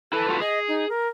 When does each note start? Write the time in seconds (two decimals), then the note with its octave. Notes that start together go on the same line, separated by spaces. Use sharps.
0.13 E4 A4 B4
0.28 F4 F#4 B4
0.40 G#4 D#5
0.68 D#4
0.89 A#4